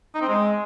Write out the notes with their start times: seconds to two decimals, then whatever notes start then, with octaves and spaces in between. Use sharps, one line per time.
0.15 D#4
0.21 C4
0.28 G#3